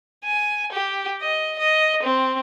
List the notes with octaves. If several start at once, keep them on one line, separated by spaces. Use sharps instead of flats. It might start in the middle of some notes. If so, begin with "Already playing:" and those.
G#5
G4
D#5
D#5
C4